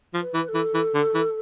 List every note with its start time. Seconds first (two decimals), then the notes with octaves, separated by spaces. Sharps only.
0.14 F3
0.21 B4
0.34 E3
0.48 A4
0.54 E3
0.74 E3
0.95 D3
1.15 E3